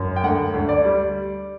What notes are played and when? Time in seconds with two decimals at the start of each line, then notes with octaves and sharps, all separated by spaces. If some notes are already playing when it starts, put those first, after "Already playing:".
Already playing: F#2
0.16 G5
0.23 D2 F#5
0.54 D2
0.69 D5
0.85 G3